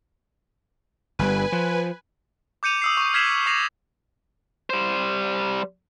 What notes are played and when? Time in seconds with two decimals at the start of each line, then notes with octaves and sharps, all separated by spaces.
1.19 G1 D3 G3 B4 G#5
1.52 F3
2.63 D6 G6 C#7 D#7 F7
2.82 D#6 E6 C7
2.97 C#6
3.14 F6 G#6 B6 C7 E7 F#7
3.46 D6 A#6 C7 F7
4.70 G3 C5